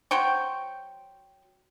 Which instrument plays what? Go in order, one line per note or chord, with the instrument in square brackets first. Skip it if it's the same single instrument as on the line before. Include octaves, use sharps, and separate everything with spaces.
[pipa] F#3 C5 G5 C#6